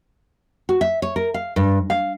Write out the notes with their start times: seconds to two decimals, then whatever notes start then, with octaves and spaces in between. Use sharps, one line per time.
0.69 F#4
0.81 E5
1.02 C#5
1.16 A#4
1.34 F5
1.56 G2
1.90 F5